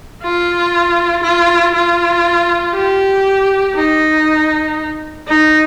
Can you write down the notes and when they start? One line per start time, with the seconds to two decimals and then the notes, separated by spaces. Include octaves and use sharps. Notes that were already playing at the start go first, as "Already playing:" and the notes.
0.23 F4
1.23 F4
1.74 F4
2.75 G4
3.75 D#4
5.28 D#4